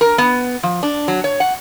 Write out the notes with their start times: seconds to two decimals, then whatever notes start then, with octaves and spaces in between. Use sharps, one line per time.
0.01 A#4
0.18 B3
0.63 F3
0.83 D4
1.08 F#3
1.24 C#5
1.40 F#5